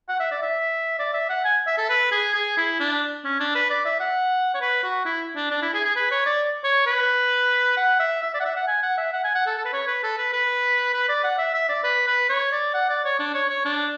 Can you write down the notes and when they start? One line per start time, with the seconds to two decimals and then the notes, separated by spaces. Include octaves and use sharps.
0.09 F#5
0.20 E5
0.31 D5
0.42 E5
0.99 D5
1.14 E5
1.29 F#5
1.45 G#5
1.67 E5
1.78 A4
1.90 B4
2.12 G#4
2.34 G#4
2.58 E4
2.80 D4
3.25 C#4
3.40 D4
3.55 B4
3.70 D5
3.86 E5
4.00 F#5
4.55 C#5
4.61 B4
4.83 F#4
5.05 E4
5.36 D4
5.51 D4
5.62 E4
5.74 G#4
5.85 G#4
5.96 B4
6.11 C#5
6.26 D5
6.64 C#5
6.87 B4
7.77 F#5
8.00 E5
8.23 E5
8.34 D5
8.40 F#5
8.45 E5
8.56 F#5
8.68 G#5
8.83 F#5
8.98 E5
9.13 F#5
9.24 G#5
9.35 F#5
9.47 A4
9.58 A4
9.65 B4
9.73 C#5
9.88 B4
10.03 A4
10.18 B4
10.33 B4
10.94 B4
11.09 D5
11.24 F#5
11.38 E5
11.54 E5
11.69 D5
11.84 B4
12.07 B4
12.30 C#5
12.52 D5
12.74 F#5
12.89 D5
13.05 C#5
13.19 D4
13.34 C#5
13.50 C#5
13.65 D4